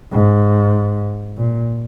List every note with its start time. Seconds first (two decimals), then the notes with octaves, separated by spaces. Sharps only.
0.12 G#2
1.37 A#2